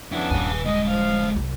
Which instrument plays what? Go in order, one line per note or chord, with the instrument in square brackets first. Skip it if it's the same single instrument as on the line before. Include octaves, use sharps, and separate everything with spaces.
[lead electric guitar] F2 E4 [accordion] C#3 B3 D4
[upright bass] D#1 G2 [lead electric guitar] B4 G#5
[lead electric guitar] D2 G#3 [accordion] D#5
[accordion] F3 F5
[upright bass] C2 F#2